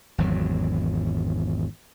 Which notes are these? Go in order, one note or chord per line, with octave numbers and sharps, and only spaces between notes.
G#1 E2 F#3